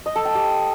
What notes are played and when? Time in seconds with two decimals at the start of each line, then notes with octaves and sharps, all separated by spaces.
0.06 D#5
0.16 A4
0.25 G5
0.35 G4